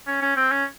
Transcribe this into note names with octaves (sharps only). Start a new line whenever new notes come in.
C#4
C#4
C4
C#4